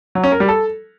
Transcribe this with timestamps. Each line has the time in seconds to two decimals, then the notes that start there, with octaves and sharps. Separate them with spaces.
0.15 F#3
0.24 C#4
0.32 A#4
0.40 G3
0.49 A4